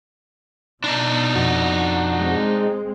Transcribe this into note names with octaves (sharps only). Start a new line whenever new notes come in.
B2 D4 D#4
F2 F#4
G#3 C4